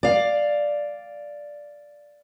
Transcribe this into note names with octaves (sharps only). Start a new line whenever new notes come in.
D5 F5